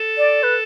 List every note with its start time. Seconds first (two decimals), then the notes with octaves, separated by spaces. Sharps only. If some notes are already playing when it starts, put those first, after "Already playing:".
Already playing: A4
0.18 D5
0.43 B4